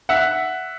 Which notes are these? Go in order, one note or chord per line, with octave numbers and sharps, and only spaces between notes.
E5 F#5